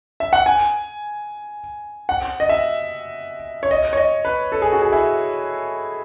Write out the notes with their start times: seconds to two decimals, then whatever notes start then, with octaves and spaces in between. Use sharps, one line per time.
0.20 E5
0.33 F#5
0.46 G#5
2.09 F#5
2.40 D#5
2.49 E5
3.63 C#5
3.71 D#5
3.93 C#5
3.97 D#5
4.25 B4
4.52 A4
4.62 G#4
4.73 F#4
4.82 G#4
4.92 E4